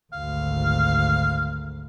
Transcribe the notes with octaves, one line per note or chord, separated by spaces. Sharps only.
G#1 D2 F5